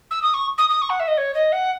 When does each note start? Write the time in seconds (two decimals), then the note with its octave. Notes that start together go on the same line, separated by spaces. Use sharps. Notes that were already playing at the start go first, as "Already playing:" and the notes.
0.10 E6
0.22 D#6
0.34 C#6
0.58 D#6
0.69 D#6
0.81 C#6
0.89 F#5
0.99 E5
1.07 D#5
1.17 C#5
1.34 D#5
1.52 F#5